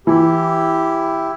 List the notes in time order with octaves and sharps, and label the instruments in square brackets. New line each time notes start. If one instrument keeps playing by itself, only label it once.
[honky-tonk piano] E3 [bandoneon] E4 [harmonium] G4